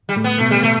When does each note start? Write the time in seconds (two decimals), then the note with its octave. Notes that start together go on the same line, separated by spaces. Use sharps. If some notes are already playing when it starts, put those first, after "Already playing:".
0.09 G3
0.16 A2 A3
0.24 B3
0.38 B2 A3 B3
0.51 G3
0.63 A3